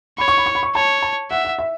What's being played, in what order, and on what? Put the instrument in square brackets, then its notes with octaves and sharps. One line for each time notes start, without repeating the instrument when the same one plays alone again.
[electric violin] C#5 [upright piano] B5
[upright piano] C#6
B5
C#6
B5
C#6
[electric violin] C#5 [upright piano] A5
[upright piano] A5
[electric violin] E5 [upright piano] F#5
[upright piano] F#5
E5